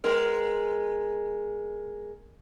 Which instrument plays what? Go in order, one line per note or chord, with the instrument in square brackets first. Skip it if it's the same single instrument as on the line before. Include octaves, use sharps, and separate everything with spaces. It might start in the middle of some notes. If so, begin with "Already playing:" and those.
[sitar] G#3 B3 A#4